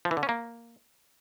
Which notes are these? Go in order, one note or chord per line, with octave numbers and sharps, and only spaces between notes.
F3
E3
D3
C#4
A#3